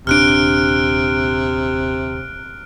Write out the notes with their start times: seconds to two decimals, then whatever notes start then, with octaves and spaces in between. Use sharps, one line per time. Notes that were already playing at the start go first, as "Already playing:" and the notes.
0.07 D#1 C3 D4 F6 F#6 D7